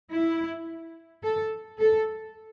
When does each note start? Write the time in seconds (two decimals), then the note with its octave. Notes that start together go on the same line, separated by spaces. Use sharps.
0.10 E4
1.23 A4
1.79 A4